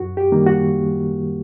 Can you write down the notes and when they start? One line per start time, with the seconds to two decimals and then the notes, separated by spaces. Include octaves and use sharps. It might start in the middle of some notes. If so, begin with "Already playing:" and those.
Already playing: F#2 F#4
0.17 G4
0.32 D#3 G3 A#3
0.47 F#4